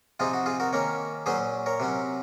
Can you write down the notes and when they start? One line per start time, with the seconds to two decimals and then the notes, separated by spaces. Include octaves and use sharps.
0.20 C3 F3 C4 D#4 F4 G#4
0.33 F#4
0.46 F4 G#4
0.60 F#4 A#4
0.73 D#3 A#3 C#4 A#4 C#5
1.26 A#2 F#3 C#4 G#4 C5
1.66 A#4 C#5
1.80 C3 F#3 C#4